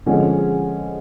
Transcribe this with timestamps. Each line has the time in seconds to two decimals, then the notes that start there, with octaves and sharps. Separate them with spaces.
0.06 D3 F3 G#3 C#4 G#4